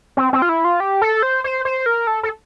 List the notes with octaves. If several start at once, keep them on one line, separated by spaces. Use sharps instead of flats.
C4
C4
F4
E4
F4
G4
A4
C5
C5
C5
A#4
A4
A4